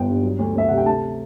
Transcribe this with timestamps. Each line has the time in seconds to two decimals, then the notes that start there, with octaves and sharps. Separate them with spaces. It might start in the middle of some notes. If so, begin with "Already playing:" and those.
Already playing: G1 B3 G5
0.08 G2
0.23 F#3
0.39 D2
0.55 D2 E5
0.68 C3 F#5
0.78 G5
0.86 A3 A5